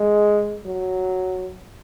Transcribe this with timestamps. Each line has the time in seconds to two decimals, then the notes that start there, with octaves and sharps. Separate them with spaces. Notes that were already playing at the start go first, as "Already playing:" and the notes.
Already playing: G#3
0.66 F#3